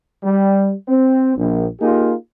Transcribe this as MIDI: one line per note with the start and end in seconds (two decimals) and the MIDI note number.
0.23 0.73 55
0.87 1.32 60
1.37 1.67 34
1.81 2.13 58
1.81 2.13 63
1.81 2.13 65
1.81 2.13 67
1.81 2.13 68